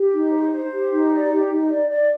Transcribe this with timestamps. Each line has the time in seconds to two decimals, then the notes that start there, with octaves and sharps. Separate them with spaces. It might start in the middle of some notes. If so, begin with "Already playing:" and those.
Already playing: G4
0.11 D#4
0.32 C5
0.51 C5
0.71 G4
0.91 D#4
1.11 D5
1.30 G4
1.50 D#4
1.69 D5
1.90 D5